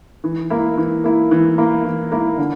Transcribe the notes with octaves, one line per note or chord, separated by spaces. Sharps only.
E3
A#3 E4
E3
A#3 E4
E3
A#3 E4
E3
A#3 E4
D3